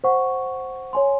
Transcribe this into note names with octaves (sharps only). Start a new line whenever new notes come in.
C5 F#5 C#6
C#5 G#5 C6